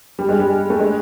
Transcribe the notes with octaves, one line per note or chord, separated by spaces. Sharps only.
G3
G#3
G3
A3
G#3